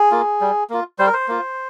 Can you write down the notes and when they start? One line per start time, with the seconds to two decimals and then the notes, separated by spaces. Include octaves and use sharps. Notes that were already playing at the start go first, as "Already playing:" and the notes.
Already playing: G#4
0.11 A#3 F4
0.41 G3
0.70 A#3 F4
0.99 G3 C5
1.07 A#4
1.13 C5
1.28 A#3 F4